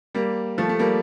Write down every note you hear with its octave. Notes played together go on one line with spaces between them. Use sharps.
G3 A#3
F3 A3
A3
G3 A#3